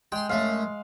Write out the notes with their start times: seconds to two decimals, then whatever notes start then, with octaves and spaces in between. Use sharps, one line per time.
0.12 G#3 G5 C6
0.30 F#2 A3 F5